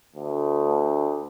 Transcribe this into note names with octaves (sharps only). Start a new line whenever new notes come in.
D2